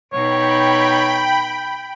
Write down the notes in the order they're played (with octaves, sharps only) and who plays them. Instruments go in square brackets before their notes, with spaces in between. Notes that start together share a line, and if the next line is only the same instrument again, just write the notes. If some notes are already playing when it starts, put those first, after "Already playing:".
[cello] B2 D#4 [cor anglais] C#5 [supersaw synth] G5 B5